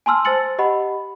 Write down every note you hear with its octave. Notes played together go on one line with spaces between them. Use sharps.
G#5 A5 C6 E6 F6
C5 A5 E6 A6 C#7 F#7
G4 D#5 F#5 B5